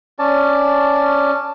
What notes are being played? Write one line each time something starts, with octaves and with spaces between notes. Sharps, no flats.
C#4 D5 A5